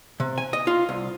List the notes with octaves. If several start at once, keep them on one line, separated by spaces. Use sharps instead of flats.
C3
G#5
D#5
F4
C2